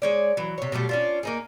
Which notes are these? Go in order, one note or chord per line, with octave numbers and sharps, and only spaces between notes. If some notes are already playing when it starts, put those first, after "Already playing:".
G#3 C#5 D5
E3 F#3
C3 C#5
B2 F#3 G3 A3
C#4 D4 F4
A#3 D#4 G#4